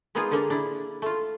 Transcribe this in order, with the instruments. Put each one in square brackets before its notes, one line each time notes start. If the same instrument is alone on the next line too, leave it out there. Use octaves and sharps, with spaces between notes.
[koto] G#3 A#3 B3 D#4 F4 G#4
D3 A#3 D4
D4 E4
A3 F4